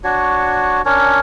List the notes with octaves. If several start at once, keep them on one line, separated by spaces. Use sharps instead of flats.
D4 F#4 C#5
C#4 D4 A#4 C#5